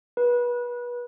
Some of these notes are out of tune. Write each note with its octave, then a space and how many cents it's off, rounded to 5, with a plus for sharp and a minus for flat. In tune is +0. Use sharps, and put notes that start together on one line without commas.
B4 -30